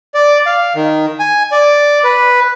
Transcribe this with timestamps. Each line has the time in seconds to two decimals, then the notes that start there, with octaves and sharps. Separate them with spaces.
0.14 D5
0.46 F5
0.75 D#3
1.19 G#5
1.52 D5
2.04 B4